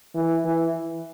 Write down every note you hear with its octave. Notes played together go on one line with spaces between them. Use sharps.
E3
E3